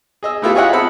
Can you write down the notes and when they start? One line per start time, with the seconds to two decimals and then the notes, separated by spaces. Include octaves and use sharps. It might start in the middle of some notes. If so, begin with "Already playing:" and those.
0.23 G#4 D#5 E6
0.42 A3 B3 E4 F4 G4 A4
0.55 F4 G#4 C#5 D#5 E5 F#5
0.73 C4 F4 A5 B5 E6